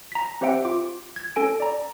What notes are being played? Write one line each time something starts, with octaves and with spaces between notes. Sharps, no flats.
A#5 B6
C4 G4 C5 E5 F#5 G5
F4 D6
G#6
C#4 A4 G#5 D7
D5 A#5